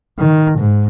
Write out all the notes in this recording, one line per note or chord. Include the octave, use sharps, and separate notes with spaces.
D#3
G#2